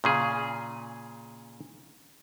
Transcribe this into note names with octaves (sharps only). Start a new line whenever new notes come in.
A#2 C#3 G#4